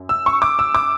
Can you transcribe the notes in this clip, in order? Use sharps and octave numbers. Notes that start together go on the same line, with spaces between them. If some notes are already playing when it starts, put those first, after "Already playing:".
Already playing: F#2
E6
C#6
D6
E6
D6